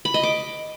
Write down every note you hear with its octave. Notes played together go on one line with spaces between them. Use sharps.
B5
D#5
D6